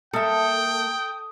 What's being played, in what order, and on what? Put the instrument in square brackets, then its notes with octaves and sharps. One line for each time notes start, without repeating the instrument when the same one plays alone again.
[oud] A#3 E5 [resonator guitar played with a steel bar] A4 [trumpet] G5 [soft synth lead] D#6